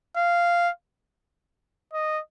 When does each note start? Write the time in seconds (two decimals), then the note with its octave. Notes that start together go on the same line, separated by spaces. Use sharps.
0.17 F5
1.94 D#5